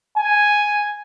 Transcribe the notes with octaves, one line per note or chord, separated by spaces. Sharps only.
G#5